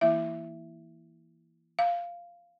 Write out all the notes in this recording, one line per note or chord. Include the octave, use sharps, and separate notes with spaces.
E3 A#3 E4 E5
F5